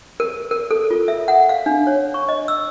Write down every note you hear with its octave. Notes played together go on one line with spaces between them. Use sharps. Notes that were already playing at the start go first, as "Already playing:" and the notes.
A#4
A#4
A4
F4
E5
F#5
F5
D4
C#5
C#6
D#5
E6